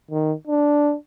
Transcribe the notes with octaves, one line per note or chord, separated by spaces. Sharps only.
D#3
D4